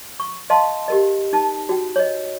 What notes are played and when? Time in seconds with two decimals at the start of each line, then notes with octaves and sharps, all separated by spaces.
0.20 C#6
0.50 D#5 F5 A5 C6
0.88 G4 A#4 D#5
1.33 D#4 A5
1.69 F#4 G5
1.96 C#5 D#5